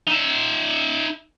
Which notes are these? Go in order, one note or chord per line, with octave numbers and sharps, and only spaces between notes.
D#4 E5